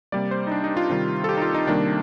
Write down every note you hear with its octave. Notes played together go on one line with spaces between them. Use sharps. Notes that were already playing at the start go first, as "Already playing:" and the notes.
C3 G3 A#3 D5
C5
D#4
D4
D#4
F4
C3 D#3 G3
A4
G4
D#4
F4
D#4
C3 D#3 G3 A#3 D4